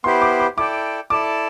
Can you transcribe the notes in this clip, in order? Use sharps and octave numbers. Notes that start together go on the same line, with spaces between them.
B3 E4 G4 C5 C6
D6
D6
E4 A4 D5 G5 D6
E4 A4 D5 A5 D6